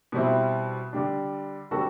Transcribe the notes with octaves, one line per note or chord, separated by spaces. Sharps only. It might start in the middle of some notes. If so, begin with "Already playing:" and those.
B2 G3 C4 E4
D3 G3 D4
D3 G3 C4 F#4 A4